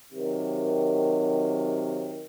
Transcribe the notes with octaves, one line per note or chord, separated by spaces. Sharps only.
C3 D#3 F#3